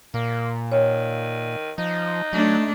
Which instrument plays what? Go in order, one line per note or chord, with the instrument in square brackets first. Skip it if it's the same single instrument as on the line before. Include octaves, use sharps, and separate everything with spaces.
[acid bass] A#2 [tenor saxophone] A#3
[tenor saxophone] D#3 [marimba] C#5
[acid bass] F3 [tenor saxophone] D#4
[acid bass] F#3 [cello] A3 D4